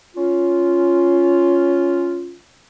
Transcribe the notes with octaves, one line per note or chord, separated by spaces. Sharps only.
C#4 F4